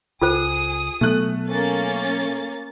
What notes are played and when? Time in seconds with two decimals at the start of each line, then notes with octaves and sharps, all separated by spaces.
0.21 C#2 F4 G#4 A4 C5 D#6
1.01 B2 F#3 A3 B3 F#6
1.48 A#3 C#4 A6